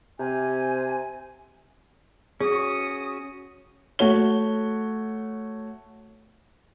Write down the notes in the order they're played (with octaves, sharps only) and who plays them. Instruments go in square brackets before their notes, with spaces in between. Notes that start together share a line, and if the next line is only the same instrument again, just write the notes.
[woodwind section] C3 G#5
[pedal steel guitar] C#4 F#4 [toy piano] G#4 [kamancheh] D#6
[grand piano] A3 F#4 C#5 G7